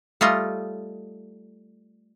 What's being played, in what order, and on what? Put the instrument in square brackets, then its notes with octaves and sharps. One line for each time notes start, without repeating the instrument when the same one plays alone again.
[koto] G3 A3 F4 D#5